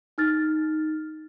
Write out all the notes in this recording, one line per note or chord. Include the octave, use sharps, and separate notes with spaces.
D#4 F6 A6